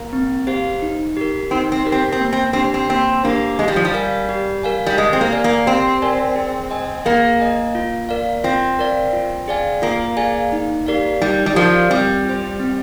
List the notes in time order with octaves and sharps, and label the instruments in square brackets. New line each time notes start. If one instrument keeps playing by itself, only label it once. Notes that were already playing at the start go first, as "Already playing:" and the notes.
Already playing: [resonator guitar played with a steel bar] A#3
[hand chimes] C4
G4 C5 F5
D#4
G4 A#4
[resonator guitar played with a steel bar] C4 [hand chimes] D#4
[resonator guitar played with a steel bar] C4
[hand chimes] G4 A#4
[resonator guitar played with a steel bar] C4
C4
[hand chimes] A#3
[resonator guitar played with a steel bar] C4
[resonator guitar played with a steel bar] C4 [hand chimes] D4 G4 C5
[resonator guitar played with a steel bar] C4
[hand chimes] A#3 [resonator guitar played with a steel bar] C4
[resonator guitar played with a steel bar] A#3 [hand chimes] D4 G4 C5
[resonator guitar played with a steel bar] G#3 [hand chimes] G4
[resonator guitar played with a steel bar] G3
F3
G3
[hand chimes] A#4 F5 G#5
G4
A#4 F5 G#5
[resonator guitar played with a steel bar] G3
[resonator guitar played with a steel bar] G#3 [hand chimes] G4
[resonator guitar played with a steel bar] C4
A#3
[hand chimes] A#4 D5 G#5
[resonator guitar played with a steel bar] A#3
[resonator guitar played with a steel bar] C4 [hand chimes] G4
[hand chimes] A#4 D5 G#5
G#4
D#5 G#5
[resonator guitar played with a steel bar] A#3 [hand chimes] G#4
[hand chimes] D#5 G#5
F4
A#4 D5 F5
[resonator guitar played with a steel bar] C4 [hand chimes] F4
[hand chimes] A#4 D5 F5
F4
G#4 D5 F5 G#5
[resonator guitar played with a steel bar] A#3 [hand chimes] F4
[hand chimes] G#4 D5 F5 G#5
D#4
G4 A#4 D5 F5
[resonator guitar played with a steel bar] G3 [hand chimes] D#4
[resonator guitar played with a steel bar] G3
[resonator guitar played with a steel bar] F3 [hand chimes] G4 A#4 D5 F5
[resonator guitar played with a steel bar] G3 [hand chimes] C4
[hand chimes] F4 C5
C4